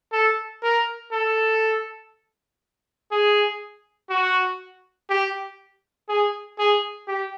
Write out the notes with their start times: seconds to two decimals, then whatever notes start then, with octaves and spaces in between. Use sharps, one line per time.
0.13 A4
0.63 A#4
1.12 A4
3.12 G#4
4.10 F#4
5.10 G4
6.09 G#4
6.59 G#4
7.08 G4